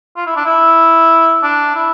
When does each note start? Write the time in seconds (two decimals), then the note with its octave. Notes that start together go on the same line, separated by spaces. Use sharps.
0.16 F4
0.27 E4
0.36 D4
0.46 E4
1.43 D4
1.75 E4